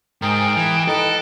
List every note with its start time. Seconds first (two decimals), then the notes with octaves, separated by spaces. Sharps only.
0.22 G#2 G#4 A#4 G5
0.57 E3
0.88 D#4 A4 B4 D#5